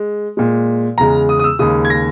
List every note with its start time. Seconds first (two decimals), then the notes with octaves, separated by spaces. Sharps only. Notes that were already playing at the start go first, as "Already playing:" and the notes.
Already playing: G#3
0.37 A#2 G#3
0.98 E2 C#3 G#3 A#5
1.29 D#6
1.39 D#6
1.44 E6
1.59 D#2 C#3 G#3 D#6
1.85 G#6
1.90 A#6